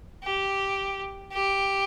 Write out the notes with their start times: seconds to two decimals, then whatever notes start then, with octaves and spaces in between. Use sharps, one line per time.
0.24 G4
1.33 G4